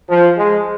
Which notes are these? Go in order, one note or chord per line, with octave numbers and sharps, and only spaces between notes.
F3
G#3